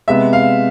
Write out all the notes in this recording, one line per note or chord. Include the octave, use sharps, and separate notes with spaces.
C3 G#3 B3 E5
F5